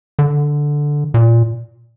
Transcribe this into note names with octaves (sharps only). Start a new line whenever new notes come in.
D3
A#2